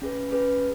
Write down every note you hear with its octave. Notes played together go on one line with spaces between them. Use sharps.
C#4 G#4 B4
C#4 G#4 B4